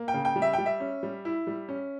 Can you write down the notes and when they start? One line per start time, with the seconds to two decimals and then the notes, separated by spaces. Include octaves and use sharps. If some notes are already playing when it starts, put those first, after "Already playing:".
Already playing: A#3
0.08 G5
0.14 C#3
0.25 G5
0.36 G3
0.42 E5
0.53 G3 G5
0.66 E5
0.80 C#4
1.03 G3
1.25 E4
1.47 G3
1.69 C#4